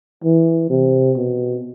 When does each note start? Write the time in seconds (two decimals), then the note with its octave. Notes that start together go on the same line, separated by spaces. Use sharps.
0.24 E3
0.70 C3
1.17 B2